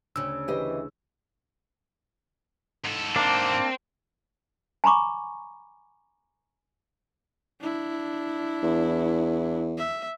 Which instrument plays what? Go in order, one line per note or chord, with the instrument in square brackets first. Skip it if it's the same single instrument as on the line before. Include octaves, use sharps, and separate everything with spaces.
[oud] D2 C#3 [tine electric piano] E6
[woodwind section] E3 [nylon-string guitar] G4 C5 D#5
[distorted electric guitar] G#2 A4
[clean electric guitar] A#3 D4 [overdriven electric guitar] C4
[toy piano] G#5 A#5 B5 C#6 D6
[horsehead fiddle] D4 E4
[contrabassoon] E2
[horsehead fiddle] E5